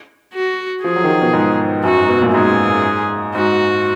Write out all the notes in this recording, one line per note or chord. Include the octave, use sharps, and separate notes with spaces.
F#4
F3 G#4
F#3
D#3
F3
B2
G#2
F#2 F#4
G#2
B2
A#2
F#2
G#2 G#4
G#2 F#4